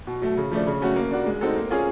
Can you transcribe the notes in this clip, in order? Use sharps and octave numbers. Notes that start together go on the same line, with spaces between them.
B2
F#3 A3
C#3
F3 A3 D4
C#3
F#3 A3 C#4 F#4
A#3
D4 F#4
G#3
C4 D#4 F#4 A4
A#3
C#4 F4 G#4